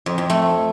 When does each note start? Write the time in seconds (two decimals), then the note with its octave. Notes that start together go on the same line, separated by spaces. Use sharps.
0.06 F2
0.18 F2
0.30 A3